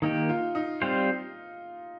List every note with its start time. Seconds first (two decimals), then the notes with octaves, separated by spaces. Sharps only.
0.02 D#3 A#3 D#4 G4
0.29 F4
0.55 D#4
0.82 G3 C4 F4 C5